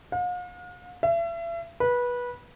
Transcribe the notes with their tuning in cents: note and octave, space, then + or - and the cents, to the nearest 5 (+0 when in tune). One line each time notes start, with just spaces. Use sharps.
F5 +45
E5 +40
B4 -20